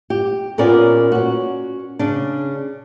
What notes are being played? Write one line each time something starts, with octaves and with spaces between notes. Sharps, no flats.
G4
A#2 A#3 B3 C#4 A#4 D5
C#4 F#4
C#3 D4